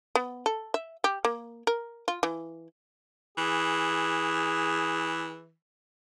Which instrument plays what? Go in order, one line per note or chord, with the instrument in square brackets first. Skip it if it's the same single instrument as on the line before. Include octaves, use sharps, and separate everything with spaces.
[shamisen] B3
A4
E5
G4
A#3
A#4
F4
E3
[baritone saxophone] E3 [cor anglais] G#4